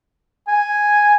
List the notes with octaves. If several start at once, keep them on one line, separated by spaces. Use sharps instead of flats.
G#5